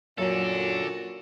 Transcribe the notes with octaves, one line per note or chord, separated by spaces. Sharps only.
F#2 A#2 D4 F#4 A4